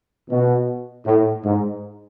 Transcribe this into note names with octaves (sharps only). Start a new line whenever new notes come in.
B2
A2
G#2